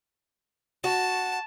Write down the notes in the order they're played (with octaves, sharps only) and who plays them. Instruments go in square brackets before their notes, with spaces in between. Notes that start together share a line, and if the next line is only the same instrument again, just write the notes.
[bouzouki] F#4 [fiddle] A5